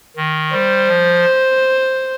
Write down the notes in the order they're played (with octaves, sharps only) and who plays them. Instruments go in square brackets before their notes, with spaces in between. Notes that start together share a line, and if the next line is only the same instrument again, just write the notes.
[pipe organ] D#3
[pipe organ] G3 [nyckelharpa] C5
[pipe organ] F3